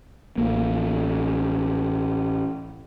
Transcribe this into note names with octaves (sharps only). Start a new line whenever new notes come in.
A1 A#3